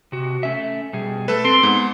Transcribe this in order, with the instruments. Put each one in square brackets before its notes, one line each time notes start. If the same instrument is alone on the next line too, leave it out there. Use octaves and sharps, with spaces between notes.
[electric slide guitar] C3 F#4
A3 C#4 E5
B2 G3 G#4
[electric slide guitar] A3 [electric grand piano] A4 B4
[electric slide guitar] C4 [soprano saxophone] C6
[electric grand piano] G#2 [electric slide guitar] B3